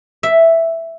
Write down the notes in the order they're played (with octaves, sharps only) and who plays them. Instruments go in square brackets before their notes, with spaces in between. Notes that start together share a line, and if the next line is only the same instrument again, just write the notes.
[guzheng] E5